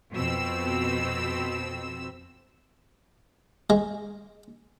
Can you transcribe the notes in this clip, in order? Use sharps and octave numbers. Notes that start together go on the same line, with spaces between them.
F2 B2 C4 E6
G#3